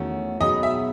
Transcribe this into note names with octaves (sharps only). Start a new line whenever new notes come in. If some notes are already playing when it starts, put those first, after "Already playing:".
Already playing: E2 D#3 A3 C#4 F#4
B2 F#3 B3 D#4 G#4 D#5
E5